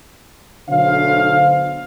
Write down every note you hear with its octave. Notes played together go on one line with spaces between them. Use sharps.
B1 D3 A3 C5 F5